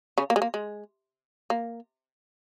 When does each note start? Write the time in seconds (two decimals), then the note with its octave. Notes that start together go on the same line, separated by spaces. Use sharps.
0.18 C#3 C#4
0.30 A#3
0.36 G#3
0.42 A#3
0.54 G#3
1.50 A#3